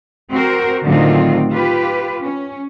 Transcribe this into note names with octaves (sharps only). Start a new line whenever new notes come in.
C4 F#4 A#4 C5
A2 D3 D#3 F#3 C4 F4
F4 G4 B4
C#4